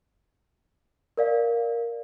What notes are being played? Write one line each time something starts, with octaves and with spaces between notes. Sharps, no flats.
A#4 D5 F5